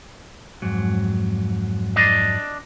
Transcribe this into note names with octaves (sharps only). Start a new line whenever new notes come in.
F2 G#2 F#3
D4 D#5